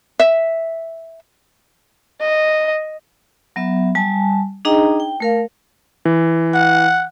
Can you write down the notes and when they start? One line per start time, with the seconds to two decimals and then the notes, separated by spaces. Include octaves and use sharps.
0.20 E5
2.21 D#5
3.56 F#3 B3 E5
3.95 G3 G#5 A5
4.65 D4 D#4 G#4 D#5 G5 A#5
5.00 G5
5.20 A3 A#4 F5
6.05 E3
6.54 F#5